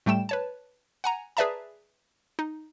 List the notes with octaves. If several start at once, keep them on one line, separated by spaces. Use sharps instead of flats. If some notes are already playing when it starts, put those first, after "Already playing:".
A2 G3 A3 G5 E7
B4 C#5 A5
F#5 G#5 A#5
G#4 B4 D5 E5 A5 A#5
D#4